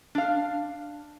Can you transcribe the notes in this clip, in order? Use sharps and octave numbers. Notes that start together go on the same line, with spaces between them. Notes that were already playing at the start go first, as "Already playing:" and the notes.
D4 F5